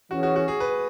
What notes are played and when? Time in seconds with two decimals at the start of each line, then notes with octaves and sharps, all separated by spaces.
0.10 E3 C#4 F#4 G#4
0.23 F#4
0.36 F#4
0.48 G#4
0.60 B4